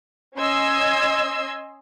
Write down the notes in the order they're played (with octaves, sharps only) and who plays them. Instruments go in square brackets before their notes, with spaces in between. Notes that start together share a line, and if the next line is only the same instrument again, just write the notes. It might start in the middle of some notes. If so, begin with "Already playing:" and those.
[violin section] C#4 D#5 C6 E6 G#6